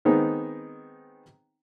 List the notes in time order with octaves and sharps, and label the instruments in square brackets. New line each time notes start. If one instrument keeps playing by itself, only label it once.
[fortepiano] D#3 G#3 B3 C4 D#4